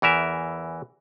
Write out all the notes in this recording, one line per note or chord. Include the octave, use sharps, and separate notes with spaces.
E2 E3 A#4 E5